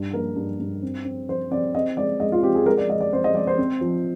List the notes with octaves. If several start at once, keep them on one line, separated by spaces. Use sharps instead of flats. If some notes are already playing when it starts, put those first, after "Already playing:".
Already playing: G2
A#3 A#4
G2
G2
C4
C4
C4 C5
C4 D5
C4 D#5
G#3 D5
G#3 D#5
F4
C4 G4
G#4
G#3 A#4
D5
G#3 D#5
D5
C4 C5
D#5
G#3 D5
C5
C4
F3